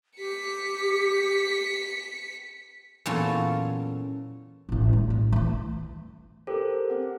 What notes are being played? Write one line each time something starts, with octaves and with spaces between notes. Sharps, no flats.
G4 B6 C#7
E2 A#2 F#3 C#4 F4 A4
A1 A2
G3
A2
E3 A3
G4 A4 A#4 C5
C4 F#5